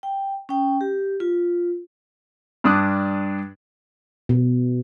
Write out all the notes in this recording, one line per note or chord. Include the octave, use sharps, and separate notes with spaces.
G5
C#4 G5
G4
F4
G2 D4 D#6 F#6
B2